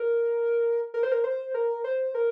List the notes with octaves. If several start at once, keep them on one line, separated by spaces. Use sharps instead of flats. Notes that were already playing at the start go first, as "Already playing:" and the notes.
Already playing: A#4
A#4
C5
A#4
C5
A#4
C5
A#4